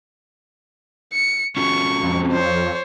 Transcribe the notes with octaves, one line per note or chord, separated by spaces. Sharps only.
C#7
C#4 F4 F#4 C#6
F2
C5 C#5